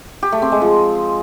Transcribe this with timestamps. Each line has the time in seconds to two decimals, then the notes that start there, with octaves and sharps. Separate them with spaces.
0.23 G4
0.32 A3
0.42 C4
0.52 G#3
0.62 F3